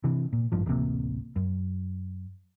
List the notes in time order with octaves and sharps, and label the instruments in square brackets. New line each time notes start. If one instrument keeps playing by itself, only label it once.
[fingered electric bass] C3 E3
A#2
G#1 G2 F3
D1 A1 C3 A#3
F#2